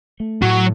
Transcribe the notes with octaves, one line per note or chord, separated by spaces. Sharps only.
A3
A2 F#3